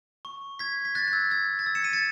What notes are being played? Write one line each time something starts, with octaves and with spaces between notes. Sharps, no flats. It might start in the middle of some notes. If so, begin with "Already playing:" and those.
C#6
G#6 B6
B6
F#6 A6
A6
E6 G#6
E6 G#6
A6
E6 G#6
C#7 E7
B6 D#7
A6 C#7